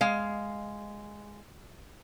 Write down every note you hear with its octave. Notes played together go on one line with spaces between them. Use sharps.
G#3 F5